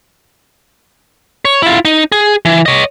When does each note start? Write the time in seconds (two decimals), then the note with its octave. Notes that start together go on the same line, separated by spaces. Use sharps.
1.45 C#5
1.62 E4 F4
1.85 D#4
2.12 G#4
2.45 E3
2.66 C#5 D#5